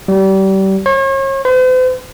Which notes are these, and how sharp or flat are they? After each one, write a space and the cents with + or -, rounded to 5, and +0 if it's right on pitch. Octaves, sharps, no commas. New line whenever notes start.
G3 -30
C#5 -40
C5 -45